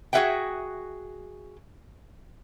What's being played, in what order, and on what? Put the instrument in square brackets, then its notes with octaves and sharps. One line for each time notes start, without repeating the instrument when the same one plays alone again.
[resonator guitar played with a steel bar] F#4 G#4 A4 E5 F#5 G5